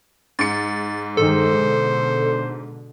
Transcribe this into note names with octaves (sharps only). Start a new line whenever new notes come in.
G#2 A6 C#7
G2 D#3 G#3 A4 C5
B2 D3